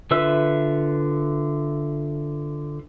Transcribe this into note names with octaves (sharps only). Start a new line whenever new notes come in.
D3 F4 B4 E5 E6